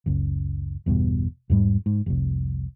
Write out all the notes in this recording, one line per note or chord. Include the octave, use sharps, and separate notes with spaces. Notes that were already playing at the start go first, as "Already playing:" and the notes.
F#1 C#2
G1 E2 G2 B2
E2 G#2 G3
G#2
F1 C2